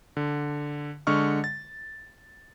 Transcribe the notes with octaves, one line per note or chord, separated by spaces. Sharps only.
D3
D3 G#3 D#5 C#6 F6
A6